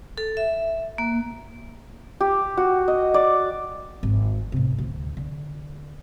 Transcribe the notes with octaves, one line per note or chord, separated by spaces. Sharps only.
A4
E5
A#3
G4
F#4
D#5
D5
G#1
A2 C3
D2
D3